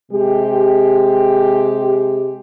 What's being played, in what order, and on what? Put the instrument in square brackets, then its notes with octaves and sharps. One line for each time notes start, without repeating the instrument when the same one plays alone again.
[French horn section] C3 G#3 G4